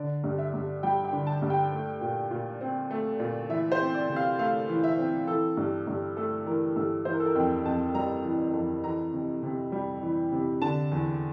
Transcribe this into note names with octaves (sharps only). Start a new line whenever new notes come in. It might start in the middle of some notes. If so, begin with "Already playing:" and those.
Already playing: D3 D5
G2
E5
G2
G3 G5
G5
D3
A5
G2
G5
A3
A#2
A#2
C4
A3
A#2
E3 E5
C5
C4
D5
C3
F5
A3 F5
E3
E5
C4
E3 A4
G2
G2
A3 A4
E3 A#4
G2 A4
E3 C5
A#4
A4
A#4
F2 G5
F2 A5
G3 A#5
E3
F2
E3 A#5
C3
C3
G3
E3
C3
D3 A5
E2